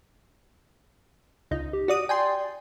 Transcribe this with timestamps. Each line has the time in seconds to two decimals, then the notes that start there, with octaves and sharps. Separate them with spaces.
1.51 C#2 D#4
1.73 G4
1.88 F#4 D5 D#6
2.09 D5 G5 G#5 C6